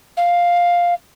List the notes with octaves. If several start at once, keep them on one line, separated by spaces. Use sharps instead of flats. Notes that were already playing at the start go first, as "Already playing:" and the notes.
F5